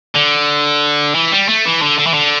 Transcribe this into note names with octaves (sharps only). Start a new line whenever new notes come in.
D3
E3
G3
A3
E3
D3
D3
E3
D3